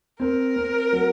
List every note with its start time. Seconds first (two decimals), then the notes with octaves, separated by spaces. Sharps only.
0.20 C4 A#4
0.56 C4
0.93 F#3